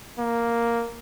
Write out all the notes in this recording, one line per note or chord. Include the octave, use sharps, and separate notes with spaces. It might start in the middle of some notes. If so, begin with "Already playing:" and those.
A#3